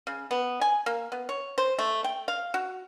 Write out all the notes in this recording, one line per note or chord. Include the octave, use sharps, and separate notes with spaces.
C#3
B3
G#5
A#3
B3
C#5
C5
A3
G5
F5
F#4